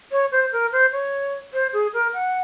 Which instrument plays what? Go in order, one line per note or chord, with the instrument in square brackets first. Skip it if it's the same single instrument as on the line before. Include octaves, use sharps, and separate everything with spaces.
[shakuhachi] C#5
C5
A#4
C5
C#5
C5
G#4
A#4
F#5